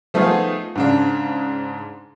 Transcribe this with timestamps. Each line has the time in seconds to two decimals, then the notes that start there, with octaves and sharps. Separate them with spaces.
0.14 F3 A3 B3 D#4 F4 G#4
0.76 G#2 C#3 D4